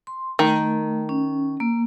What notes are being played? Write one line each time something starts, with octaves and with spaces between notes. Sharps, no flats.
C6
D#3 A3
C#4
A#3